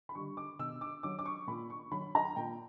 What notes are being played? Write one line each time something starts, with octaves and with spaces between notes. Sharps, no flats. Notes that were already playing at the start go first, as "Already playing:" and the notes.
B5
D3 G3 C#6
D6
B2 E6
D6
F#3 D6
D6
C#6
A#2 B5
C#6
F#3 B5
A#5
A#2 G5